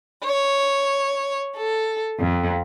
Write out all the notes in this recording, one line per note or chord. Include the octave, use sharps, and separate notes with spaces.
C#5
A4
F2